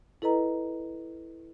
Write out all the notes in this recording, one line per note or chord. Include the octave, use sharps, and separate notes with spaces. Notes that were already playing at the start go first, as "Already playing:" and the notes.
E4 A4 B4 D#5 A#5